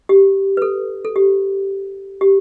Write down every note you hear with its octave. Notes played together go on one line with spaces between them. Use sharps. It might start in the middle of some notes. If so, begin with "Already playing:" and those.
G4
B4
A4
A4
G4
G4